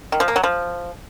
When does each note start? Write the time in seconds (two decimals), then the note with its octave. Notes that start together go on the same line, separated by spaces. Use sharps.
0.12 D#3
0.20 F3
0.28 A#3
0.36 F#3
0.44 F3